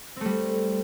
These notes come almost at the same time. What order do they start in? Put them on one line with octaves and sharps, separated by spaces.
C4 A3 G3